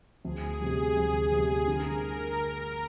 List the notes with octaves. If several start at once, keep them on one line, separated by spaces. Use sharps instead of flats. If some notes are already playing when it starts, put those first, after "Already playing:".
D2 G#4
C3 G3
D2
C3 G3
D3 A#4